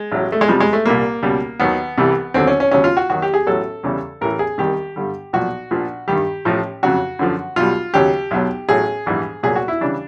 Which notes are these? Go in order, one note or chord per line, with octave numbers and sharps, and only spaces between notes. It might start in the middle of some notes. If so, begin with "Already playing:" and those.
Already playing: G#3
A1 A2 F#3
A3
G#3
F2 C3 F3 G3
G#3
A3
C2 A#2 G3 A#3
C#2 B2 G3
D#2 D#3 F#3 B3
C2 C3 E3 G3
D#2 D3 F#3 C4
C#4
C#4
D#2 C#3 F#3 C#4
F4
F#4
D#2 D#3 F#3 F#4
G4
G#4
A1 A2 F#3 A4
E2 C#3 E3 G3
A1 A2 E3 A#4
G#4
C2 C3 D#3 G3 G4
G2 D3 G3
B1 A#2 F3 F#4
A#1 A#2 F3
G2 D#3 G3 G4
A1 A2 F3
F2 C#3 F#3 F#4
F#2 D3 F3
B1 B2 G3 F4
D#2 C#3 F#3 G4
B1 B2 F#3
A1 A2 F#3 G#4
A#1 G#2 E3 G3
C2 A#2 F#3 G#4
F#4
E4
C#3 E3 G3 D4